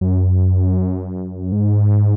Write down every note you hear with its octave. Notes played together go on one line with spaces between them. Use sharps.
F#2
G#2